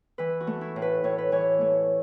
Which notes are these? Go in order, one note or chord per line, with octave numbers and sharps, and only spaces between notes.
E3 B4
F#4
A3
E4
A2
B4
A2 C#5
B4
E3 C#5
A3